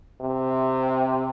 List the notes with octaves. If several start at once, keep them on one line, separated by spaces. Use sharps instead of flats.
C3